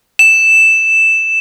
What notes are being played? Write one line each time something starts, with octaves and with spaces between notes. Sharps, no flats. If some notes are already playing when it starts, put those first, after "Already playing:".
E7